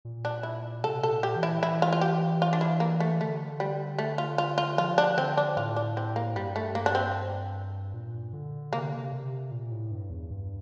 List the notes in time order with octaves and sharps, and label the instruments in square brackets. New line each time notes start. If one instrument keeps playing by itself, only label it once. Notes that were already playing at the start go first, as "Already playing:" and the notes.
[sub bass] A#2
[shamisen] D4
E4
[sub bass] C3 [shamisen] A4
[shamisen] A4
[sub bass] A#2
[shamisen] G4
[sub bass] E3
[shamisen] E4
[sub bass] E3 [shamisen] E4
[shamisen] F4
F4
G4
F4
D4
E4
A#3
A3
[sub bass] D3 [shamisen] A3
[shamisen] G3
A3
F4
F4
F4
[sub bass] F3 [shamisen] F4
[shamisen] D4
[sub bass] D3 [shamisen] C4
[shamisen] D4
[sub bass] A2 [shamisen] F4
[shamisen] D4
C4
A#3
[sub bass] G2 [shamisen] G3
[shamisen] A3
A#3
D4
C4
[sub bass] A#2
D3
[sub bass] C3 [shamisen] A#3
[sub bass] D3
C3
C3
A#2
A2
G2
E2
G2